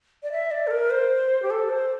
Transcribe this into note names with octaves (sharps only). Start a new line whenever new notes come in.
D5
E5
D5
A4
A#4
C5
G4
A4
C5